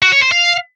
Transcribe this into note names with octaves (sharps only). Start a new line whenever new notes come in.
F#4
C#5
C5
F5